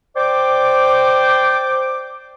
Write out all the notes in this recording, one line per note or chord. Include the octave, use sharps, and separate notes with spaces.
C5 D5 G5 D6